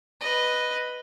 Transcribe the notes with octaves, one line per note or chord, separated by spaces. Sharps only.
B4 D#5